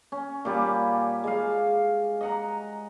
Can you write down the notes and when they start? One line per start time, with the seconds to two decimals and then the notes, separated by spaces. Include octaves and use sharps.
0.12 C#4
0.45 A#2 G3 D5 G#5
1.24 G#3 F5
2.21 D#5 F#5 A#5